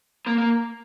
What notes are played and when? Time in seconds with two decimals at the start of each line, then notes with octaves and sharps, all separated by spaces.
0.26 A#3
0.38 A#3